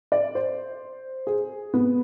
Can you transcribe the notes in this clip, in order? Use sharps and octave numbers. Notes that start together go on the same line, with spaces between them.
D5
C5
G#4
B3